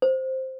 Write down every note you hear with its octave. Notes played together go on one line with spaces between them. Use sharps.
C5